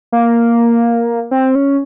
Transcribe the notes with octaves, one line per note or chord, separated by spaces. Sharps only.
A#3
C4
C#4